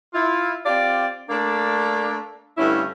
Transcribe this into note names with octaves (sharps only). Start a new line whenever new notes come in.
E4 F4
C4 F4 G4 D5
A3 A#3 D4
G2 D3 A3 C#4 E4